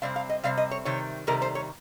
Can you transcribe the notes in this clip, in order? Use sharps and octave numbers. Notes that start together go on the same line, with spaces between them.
C3 G3 C4 F5
F5
D#5
C3 G3 C4 F5
D#5
C#5
C3 D#3 G3 C#5
C3 D#3 G3 A#4
C5
C#5